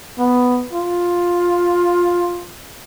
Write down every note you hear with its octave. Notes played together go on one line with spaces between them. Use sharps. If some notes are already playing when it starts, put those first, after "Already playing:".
B3
F4